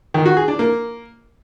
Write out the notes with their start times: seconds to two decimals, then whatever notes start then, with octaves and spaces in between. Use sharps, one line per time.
0.14 D#3
0.26 F#4
0.37 G#4
0.48 D4
0.59 A#3